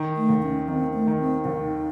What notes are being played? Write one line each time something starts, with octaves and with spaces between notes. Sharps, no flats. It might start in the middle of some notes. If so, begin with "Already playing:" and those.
Already playing: D#3
A3
D#2
C#4
D#3 C4
A3
D#3
C4
D#2 D#4